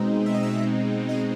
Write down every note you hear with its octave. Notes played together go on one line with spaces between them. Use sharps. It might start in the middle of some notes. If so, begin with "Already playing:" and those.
Already playing: B2 G#3 C4 D#4
E5
D#5
E5
D#5